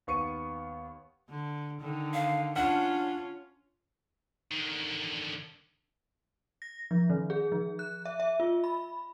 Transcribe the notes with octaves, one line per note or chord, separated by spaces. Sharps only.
D#2 B3 C#6 C#7 D#7
D3
D3 D#3
F5
C#4 D4 F4 F#5
D3 D#3
A#6
F3
D#3
G#4
F3
F#6
E5
E5
F4
B5